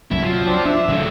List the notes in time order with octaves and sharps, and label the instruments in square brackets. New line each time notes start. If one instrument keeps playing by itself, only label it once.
[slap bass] C2 F#2 [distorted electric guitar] E4
[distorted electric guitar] F3 [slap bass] F#3
[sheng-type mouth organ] C4 D4
[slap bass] D4 [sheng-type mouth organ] E5
[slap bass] C#3 [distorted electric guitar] F#3 A3